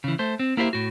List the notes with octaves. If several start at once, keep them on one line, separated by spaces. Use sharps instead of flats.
C#3 E3
A3 C5
C4
A#3 E4 G4 C5 D#5 E5
A2 F#4